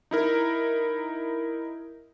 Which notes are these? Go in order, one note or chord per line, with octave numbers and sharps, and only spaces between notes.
D#4 E4 A#4